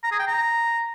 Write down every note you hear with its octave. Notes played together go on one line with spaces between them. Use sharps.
A#5
G#4
G5
A#5